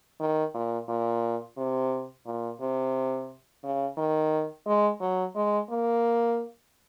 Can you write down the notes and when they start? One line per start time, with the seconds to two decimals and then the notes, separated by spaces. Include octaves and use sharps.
0.20 D#3
0.54 A#2
0.88 A#2
1.57 C3
2.26 A#2
2.60 C3
3.63 C#3
3.97 D#3
4.66 G#3
5.00 F#3
5.35 G#3
5.70 A#3